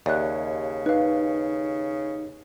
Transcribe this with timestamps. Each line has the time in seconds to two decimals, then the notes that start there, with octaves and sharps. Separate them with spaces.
0.06 D#2 C#3 D5 E5 F#6
0.86 D#4 B4 F5